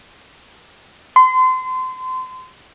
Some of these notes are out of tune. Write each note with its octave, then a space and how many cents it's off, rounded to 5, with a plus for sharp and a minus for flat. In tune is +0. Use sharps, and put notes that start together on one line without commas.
C6 -30